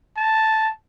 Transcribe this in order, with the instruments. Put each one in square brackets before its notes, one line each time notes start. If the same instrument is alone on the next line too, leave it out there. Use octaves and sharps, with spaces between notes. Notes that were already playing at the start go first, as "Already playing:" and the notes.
[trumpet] A5